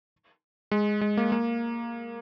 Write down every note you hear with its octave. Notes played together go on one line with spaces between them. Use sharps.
G#3
G#3
A#3
A#3